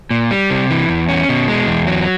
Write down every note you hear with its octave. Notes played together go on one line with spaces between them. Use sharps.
A#2
G3
C3
E3
E2
C#4
B2
G#3
E2
F#3